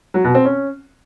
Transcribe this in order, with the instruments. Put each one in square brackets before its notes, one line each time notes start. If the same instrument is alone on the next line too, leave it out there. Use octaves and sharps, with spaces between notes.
[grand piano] F#3
B2
C4
C#4